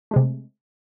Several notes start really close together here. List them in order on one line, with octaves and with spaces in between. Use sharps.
A3 G#3 C3